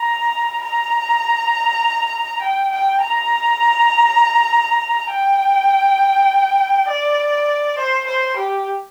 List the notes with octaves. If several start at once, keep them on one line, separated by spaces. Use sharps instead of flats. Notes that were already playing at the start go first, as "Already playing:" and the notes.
Already playing: A#5
A#5
G5
G5
A#5
G5
D5
C5
C5
G4